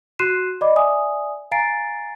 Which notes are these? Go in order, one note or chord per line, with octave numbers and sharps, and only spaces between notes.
F#4 C6 F#6 C7 D#7 E7
D5 D#5 B5 D6
D5 E5 G#5 D#6
F5 G#5 A#5 A6 C7 D7